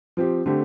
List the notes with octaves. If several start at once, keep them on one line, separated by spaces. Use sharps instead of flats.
F3 C4 G4
D3 A3 C4 G4